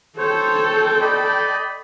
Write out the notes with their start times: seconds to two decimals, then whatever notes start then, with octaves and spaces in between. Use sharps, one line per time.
0.18 A4 C5 C#5 G5
1.01 D5 D#5 B5